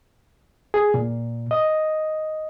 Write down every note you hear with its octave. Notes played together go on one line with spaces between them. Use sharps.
G#4
A#2
D#5